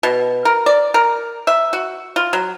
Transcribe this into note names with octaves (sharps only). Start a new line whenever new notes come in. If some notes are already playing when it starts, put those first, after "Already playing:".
B2
A#4
D5
A#4
E5
F#4
F4
F#3